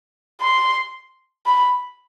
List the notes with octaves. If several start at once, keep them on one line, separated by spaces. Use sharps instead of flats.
C6
B5